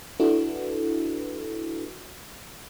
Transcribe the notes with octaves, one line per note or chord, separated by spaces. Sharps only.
D4 E4 F#4 A4 B4